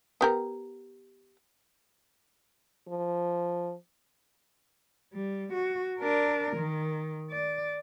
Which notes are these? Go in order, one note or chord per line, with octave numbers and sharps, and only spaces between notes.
B3 G4 A#4
F3
G3
F#4
D4 A#4
D#3
D5